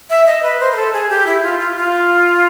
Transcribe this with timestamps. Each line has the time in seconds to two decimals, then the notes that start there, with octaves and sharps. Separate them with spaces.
0.10 E5
0.26 D#5
0.43 B4
0.60 C5
0.72 A#4
0.76 A4
0.93 G#4
1.10 G4
1.27 E4
1.43 F4
1.59 F4
1.76 F4